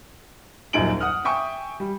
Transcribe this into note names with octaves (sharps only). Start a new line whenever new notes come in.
D#1 A#1 F#2 D#4 D7 F#7
F#5 D#6 F6
E5 G5 G#5 C#6 D#6
G3